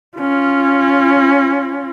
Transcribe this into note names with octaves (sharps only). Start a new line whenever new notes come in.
C#4 F4